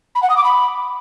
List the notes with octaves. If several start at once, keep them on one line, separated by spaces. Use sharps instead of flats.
B5
F#5
D#6
D6
B5